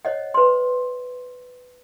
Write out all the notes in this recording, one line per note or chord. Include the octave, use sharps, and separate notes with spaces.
C5 C#5 D#5 F#5
B4 C6